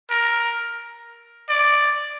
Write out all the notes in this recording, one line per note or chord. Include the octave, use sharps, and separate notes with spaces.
A#4
D5